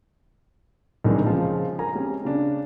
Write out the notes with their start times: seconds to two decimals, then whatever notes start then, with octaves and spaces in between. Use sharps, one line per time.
1.04 C2 D#3 E3 G#3 C4 D4
1.25 C#3 F3 G#3
1.79 A#4 G#5 A#5
1.94 G#3 C4 C#4 G4
2.25 C#3 D4